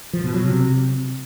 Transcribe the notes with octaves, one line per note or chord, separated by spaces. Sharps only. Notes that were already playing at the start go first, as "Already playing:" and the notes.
F3
B2
F#3
C3